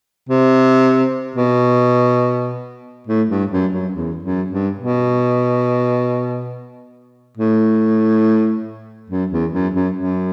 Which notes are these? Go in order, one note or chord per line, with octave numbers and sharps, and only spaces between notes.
C3
B2
A2
G2
F#2
F#2
E2
F#2
G2
B2
A2
F#2
E2
F#2
F#2
F#2